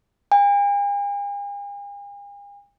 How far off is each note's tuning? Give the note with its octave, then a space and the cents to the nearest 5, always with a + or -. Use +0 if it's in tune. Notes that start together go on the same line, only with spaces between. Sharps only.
G#5 -45